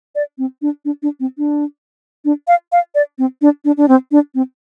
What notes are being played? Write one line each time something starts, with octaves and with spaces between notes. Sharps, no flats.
D5
C4
D4
D4
D4
C4
D4
D4
F5
F5
D5
C4
D4
D4
D4
C4
D4
C4